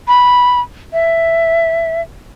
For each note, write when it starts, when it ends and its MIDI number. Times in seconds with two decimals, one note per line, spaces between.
0.08 0.61 83
0.93 2.01 76